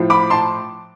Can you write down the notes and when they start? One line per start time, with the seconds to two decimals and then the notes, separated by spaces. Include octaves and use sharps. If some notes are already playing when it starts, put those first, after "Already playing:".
Already playing: A2 F3
0.10 B5 D6
0.30 A5 C6